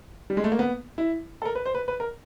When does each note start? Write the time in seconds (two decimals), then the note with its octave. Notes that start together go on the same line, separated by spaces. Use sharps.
0.30 G3
0.37 G#3
0.44 A3
0.52 A#3
0.59 B3
0.98 E4
1.42 A4
1.45 A#4
1.55 B4
1.65 C5
1.75 B4
1.88 B4
2.00 A#4